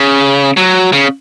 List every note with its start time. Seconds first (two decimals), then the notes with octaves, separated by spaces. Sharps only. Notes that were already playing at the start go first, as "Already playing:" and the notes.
Already playing: C#3
0.57 F#3
0.93 C#3